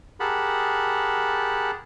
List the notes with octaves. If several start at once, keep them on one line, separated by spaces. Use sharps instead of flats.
G4 G#4 A#4 F#5 A5 B5